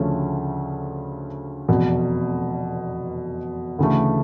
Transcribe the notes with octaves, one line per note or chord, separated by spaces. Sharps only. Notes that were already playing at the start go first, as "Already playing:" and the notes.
Already playing: D2 C#3 F3 A3 C#4
F1 E2 B2
D2 C#3 E3 A3